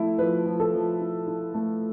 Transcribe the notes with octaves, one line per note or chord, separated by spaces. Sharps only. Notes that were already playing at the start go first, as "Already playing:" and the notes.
Already playing: F3 A3 E4 A4
F3 B4
F3
A4
F3
E4
E4
A3